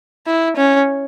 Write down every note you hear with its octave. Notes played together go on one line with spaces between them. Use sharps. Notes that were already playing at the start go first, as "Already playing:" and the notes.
E4
C#4